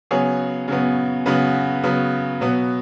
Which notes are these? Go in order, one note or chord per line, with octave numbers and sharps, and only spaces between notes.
C#3 F#3 B3 G#4 C#5
C#3 F#3 B3
C#3 F#3 B3 F#4 B4
C#3 F#3 B3
B2 F#3 B3